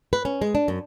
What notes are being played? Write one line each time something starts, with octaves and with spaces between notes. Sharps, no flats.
B4
C#4
G#3
D4
F#2